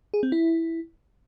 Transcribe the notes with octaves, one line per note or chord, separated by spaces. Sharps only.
G#4
C4
E4